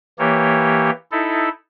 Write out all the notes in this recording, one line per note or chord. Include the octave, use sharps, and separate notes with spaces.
E3 A#3 G4 C#5
D#4 E4 A4